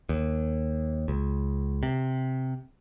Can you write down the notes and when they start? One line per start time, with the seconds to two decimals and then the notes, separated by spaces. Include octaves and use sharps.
0.09 D#2
1.08 C#2
1.83 C3